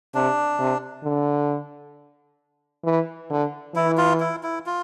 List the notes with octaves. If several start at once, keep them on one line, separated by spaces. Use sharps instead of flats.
C3 D4
C3
D3
E3
D3
E3 E4
F4
E4
E4
F4